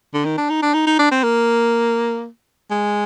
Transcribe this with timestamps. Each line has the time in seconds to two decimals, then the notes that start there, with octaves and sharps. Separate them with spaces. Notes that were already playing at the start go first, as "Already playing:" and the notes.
0.14 D3
0.25 D#3
0.38 D4
0.50 D#4
0.62 D4
0.74 D#4
0.87 D#4
0.99 D4
1.11 C4
1.23 A#3
2.71 G#3